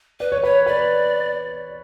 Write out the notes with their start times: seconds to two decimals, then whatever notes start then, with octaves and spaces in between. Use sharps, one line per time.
0.20 B4 D5
0.32 C#5
0.43 B4 C#5
0.66 B4 D5